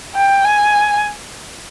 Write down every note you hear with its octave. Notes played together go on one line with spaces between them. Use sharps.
G5
G#5